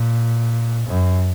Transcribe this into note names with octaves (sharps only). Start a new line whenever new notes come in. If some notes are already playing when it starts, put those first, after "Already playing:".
Already playing: A#2
F#2